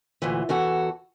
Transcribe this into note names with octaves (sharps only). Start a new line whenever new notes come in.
D2 A#2 E3
E2 E3 F#4 A4